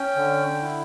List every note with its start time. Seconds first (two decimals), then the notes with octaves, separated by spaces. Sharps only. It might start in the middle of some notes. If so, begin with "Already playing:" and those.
Already playing: C#4 G5
0.16 D3
0.62 E4